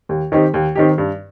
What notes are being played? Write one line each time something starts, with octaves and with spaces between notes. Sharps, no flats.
D#2
D#3 C4 D#4 G4
D#2
D#3 C4 D#4 G4
G2